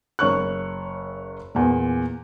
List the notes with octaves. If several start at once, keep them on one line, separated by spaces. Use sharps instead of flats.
F#1 C#5 C#6 F#6
E2 A#2